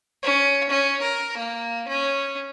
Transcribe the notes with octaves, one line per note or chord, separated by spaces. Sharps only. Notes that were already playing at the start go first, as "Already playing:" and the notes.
C#4
C#4
A#4
A#3
C#4